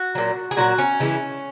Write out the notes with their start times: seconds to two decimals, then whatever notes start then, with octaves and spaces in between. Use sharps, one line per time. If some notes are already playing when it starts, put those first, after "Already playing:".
Already playing: F#4
0.15 A#2 F#3
0.51 G#4
0.57 A#2 F#3 F#4
0.78 C#4
1.00 C#3 E3 G#3